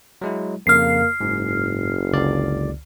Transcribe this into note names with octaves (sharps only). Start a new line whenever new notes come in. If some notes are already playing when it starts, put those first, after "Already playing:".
F#3 G#3 E4
F2 C#3 A#3 F5 F6 C7
F#1 G#2
C#2 D3 D5